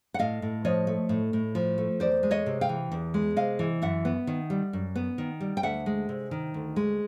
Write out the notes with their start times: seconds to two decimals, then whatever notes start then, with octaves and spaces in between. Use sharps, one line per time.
0.14 F#5
0.19 A2 D#5 F5
0.42 A2
0.65 F3 C#5 D#5
0.87 A3
1.09 A2
1.33 A2
1.55 F3
1.78 A3
2.00 E2 C5 D5
2.23 G#3
2.31 C#5 D#5
2.46 C3
2.61 F5 G5
2.69 E3
2.92 E2
3.14 G#3
3.36 C3 D#5 F5
3.59 E3
3.82 F#2 E5 F#5
4.05 B3
4.27 D#3
4.50 G3
4.73 F#2
4.96 B3
5.18 D#3
5.40 G3
5.57 G5
5.63 D2 E5 F#5
5.86 G#3
6.09 C3
6.31 D#3
6.54 D2
6.76 G#3